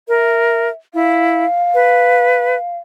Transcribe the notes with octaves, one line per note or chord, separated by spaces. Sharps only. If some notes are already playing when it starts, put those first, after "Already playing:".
A#4 E5
E4 F5
B4